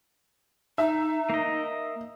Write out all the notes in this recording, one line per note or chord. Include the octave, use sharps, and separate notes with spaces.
D#4 E5
A#3 D#5